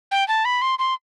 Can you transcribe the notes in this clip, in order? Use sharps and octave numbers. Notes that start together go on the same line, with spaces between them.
G5
A5
B5
C6
C6